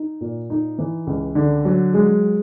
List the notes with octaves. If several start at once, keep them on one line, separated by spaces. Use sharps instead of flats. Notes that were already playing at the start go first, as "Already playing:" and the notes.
Already playing: D#4
A#2
D#4
E3
C#2
D3
F#3
G#3